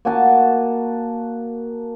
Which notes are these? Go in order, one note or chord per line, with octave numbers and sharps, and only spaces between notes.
A#3 F#4 G#5 A5